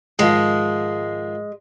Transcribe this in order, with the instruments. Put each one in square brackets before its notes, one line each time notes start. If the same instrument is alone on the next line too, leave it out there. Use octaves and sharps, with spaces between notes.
[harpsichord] G#2 D#3 F3 [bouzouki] G#3